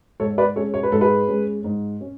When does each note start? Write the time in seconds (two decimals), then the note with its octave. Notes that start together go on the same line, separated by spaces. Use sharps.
0.20 G#2 A4 C#5
0.38 B4 D5
0.56 G#3 C#4 A4 C#5
0.74 C#5
0.83 B4
0.92 G#2 A4
1.01 G#4 B4
1.28 G#3 C#4
1.64 G#2
2.01 C#4